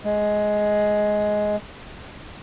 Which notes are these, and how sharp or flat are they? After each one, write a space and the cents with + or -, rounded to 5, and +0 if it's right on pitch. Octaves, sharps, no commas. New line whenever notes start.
G#3 +10